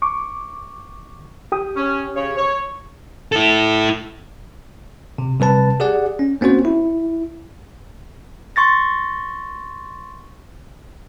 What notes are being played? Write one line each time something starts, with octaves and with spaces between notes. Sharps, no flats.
C#6 D6
G4 G5 D#6
C#4
C#3 C#5
C#5
E4 A4
C3
C3 G3 B4 A5
G4 G#4 D5 F#5
C#4
A#3 C4 C#4 F#4 C5
E4
C6 C#6 A6 A#6